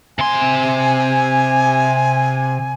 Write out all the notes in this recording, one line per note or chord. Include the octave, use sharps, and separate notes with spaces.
C3 G#5 C6